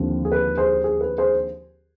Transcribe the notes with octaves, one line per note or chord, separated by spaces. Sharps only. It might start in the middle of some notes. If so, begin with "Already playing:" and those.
Already playing: D#2 D3 F3 C4
G#4
B4
G#4 C5
G#4
B4
G#4 C5